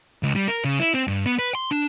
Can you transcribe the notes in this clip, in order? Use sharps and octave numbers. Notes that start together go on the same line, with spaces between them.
C#2
G3
A#4
C#3
E4
C4
G2
B3
B4
C6
D4